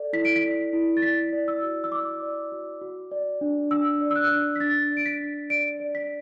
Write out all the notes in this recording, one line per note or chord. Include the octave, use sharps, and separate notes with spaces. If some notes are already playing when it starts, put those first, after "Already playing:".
Already playing: A4 D5
E4 B6
D7
B6
D5
E4
A6
D5 B6
D5
E6
F#4
E6
D5 D6
D5
F#4
F#4
D5
D4
D4 E6
D5
E6
F#6
D4
B6
D4 A6
D5
D7
B6
D4
D5 D7
D5
B6